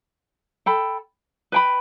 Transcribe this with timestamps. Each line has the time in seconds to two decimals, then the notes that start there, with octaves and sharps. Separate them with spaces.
0.66 A4 G5 B5
1.52 B4 G5 B5